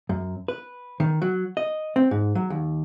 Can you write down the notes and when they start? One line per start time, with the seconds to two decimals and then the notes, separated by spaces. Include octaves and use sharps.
0.09 F#2
0.48 B4
1.00 D#3
1.22 F#3
1.57 D#5
1.96 C4
2.11 G#2
2.35 F#3
2.50 D#2